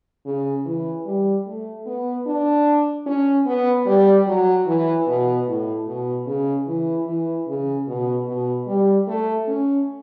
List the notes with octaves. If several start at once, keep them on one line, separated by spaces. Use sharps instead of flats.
C#3
E3
G3
A3
B3
D4
C#4
B3
G3
F#3
E3
B2
A2
B2
C#3
E3
E3
C#3
B2
B2
G3
A3
C#4